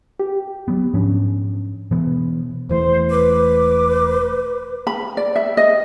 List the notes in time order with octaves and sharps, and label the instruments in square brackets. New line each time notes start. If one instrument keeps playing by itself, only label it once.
[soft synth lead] G4
[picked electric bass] F#3 B3
G#2 F3 C#4 D4
B2 E3 B3
[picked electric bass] E1 E3 A3 [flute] C5
[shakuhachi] B4 [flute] D6
[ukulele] B5
D5
E5
D#5